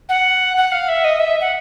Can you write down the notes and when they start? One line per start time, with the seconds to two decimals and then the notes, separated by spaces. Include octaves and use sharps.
0.09 F#5
0.57 F#5
0.72 F5
0.88 E5
1.04 D#5
1.19 E5
1.40 F#5